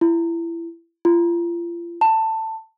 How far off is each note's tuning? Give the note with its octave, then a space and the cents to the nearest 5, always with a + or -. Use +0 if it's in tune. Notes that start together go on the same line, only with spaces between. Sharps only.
E4 +25
F4 -35
A5 +15